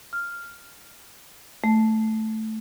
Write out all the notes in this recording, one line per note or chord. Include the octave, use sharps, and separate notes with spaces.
F6
A3